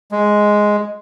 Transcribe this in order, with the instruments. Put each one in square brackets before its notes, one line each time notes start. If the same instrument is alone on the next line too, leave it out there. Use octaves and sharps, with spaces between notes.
[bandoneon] G#3